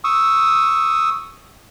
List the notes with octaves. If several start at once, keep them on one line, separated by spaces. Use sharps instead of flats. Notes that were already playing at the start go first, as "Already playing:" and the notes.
C#6 D#6 E6